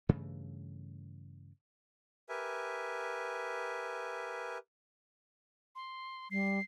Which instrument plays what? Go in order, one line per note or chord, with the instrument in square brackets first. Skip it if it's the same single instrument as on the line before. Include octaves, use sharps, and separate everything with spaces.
[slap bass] G2 C#3 E3 A3
[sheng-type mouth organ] G4 A#4 B4 E5 G#5
[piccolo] C6
[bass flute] G3 [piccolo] C7